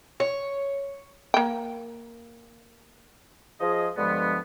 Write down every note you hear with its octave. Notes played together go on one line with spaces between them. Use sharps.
C#5
A#3 G5
F3 G#4 D#5
G2 D3 F3 G#3 B3